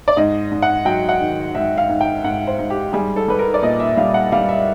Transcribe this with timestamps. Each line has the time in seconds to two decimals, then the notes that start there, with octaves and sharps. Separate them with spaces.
0.08 D5
0.17 G#2 D#5
0.52 G#2
0.62 F#5
0.85 F#3 G5
1.09 F#5
1.20 D#3
1.55 G#2 E5
1.78 F5
1.89 G#2
2.01 G5
2.24 G#2 F#5
2.47 C5
2.59 G#2
2.70 G4
2.93 G3 G#4
3.16 A4
3.28 G3 B4
3.39 A#4
3.54 D5
3.62 A#2 D#5
3.80 E5
3.97 G3 F5
4.14 F#5
4.32 G3 F5
4.49 E5